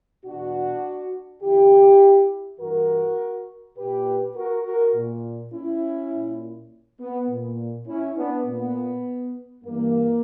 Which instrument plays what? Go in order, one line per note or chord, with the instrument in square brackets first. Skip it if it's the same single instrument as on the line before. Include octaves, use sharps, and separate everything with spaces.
[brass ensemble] E2 B2 D4 F#4
E2 D3 E4 G4
G2 E3 F#4 A#4
A#2 G4 B4
F#4 A#4
F#4 A#4
A#2
C#4 E4
A#2
B3
A#2
C#4 E4
B3 D4
A#2 B3
G2 E3 A#3